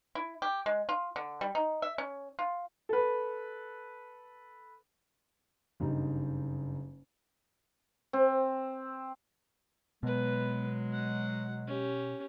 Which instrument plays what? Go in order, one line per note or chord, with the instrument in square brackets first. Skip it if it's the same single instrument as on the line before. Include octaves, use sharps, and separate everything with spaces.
[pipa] E4
G4
G#3
F4
D3
G3
D#4
E5
C#4
F4
[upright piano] A4 B4
[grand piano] F#1 G2 G3 D#4
[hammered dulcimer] C4
[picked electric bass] B2 [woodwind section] F#3 G#3 [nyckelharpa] B3 B4
[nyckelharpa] F#5
C#4 G4